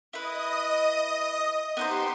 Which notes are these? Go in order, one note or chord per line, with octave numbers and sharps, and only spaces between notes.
E4 B4 D#5 D#6
B3 D#4 G4 C5 C6